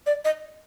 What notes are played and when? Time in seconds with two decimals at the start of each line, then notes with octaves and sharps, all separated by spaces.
0.06 D5
0.25 D#5